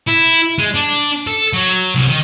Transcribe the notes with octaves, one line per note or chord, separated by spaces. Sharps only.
E4
G#3
D4
A4
F#3
C2
D#3